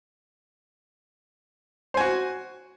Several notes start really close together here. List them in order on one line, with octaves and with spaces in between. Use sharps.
C5 G#5 F#4